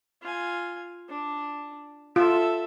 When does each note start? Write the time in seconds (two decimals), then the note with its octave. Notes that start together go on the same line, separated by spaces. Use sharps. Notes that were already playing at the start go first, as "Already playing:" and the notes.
0.22 F4 G#5
1.09 D4
2.16 F4 A4 E5